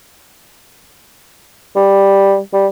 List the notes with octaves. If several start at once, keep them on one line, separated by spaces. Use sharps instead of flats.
G3
G3